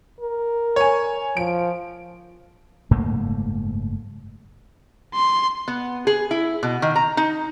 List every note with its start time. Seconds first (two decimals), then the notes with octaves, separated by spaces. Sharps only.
0.20 A#4
0.76 C#5 G#5
1.37 F3 D7
2.91 F#1 G#2 A3 A#3
5.14 C6
5.68 B3
6.07 G#4
6.31 E4
6.63 B2
6.82 D#3
6.96 A#5
7.17 D#4